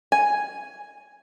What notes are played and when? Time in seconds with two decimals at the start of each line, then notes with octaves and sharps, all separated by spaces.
0.12 G#5